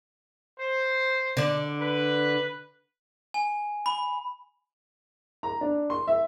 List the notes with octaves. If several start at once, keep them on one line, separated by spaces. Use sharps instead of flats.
C5
D3 D4
B4
G#5
B5
A#5
D4
C6
E5